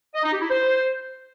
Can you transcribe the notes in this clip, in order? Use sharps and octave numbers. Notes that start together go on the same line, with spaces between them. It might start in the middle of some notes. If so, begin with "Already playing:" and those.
D#5
D#4
G4
E4
C5